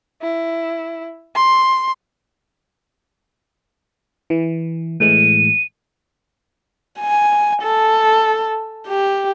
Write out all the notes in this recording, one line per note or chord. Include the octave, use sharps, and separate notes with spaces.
E4
C6
E3
A2 E3 G#3 D#7
G#5
A4
G4